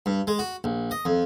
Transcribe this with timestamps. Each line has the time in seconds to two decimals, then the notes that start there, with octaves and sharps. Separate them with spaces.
0.06 G2
0.27 G#3
0.39 F#4
0.64 A#1
0.91 D#5
1.05 F2